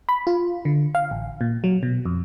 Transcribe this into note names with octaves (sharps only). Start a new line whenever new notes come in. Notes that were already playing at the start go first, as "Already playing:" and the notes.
B5
F4
D3
F5
A1
A#2
F#3
B2
F2